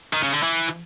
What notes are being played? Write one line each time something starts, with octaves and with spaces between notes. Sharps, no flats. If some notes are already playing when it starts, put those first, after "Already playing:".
D#3
C#3
D3
E3